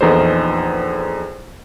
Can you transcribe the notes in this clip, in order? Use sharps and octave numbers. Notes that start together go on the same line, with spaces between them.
A#1 E2 D#4 A4 B4 C5